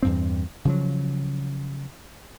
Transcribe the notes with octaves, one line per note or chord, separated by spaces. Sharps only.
E2 G2 C4
C#3 F3 F#3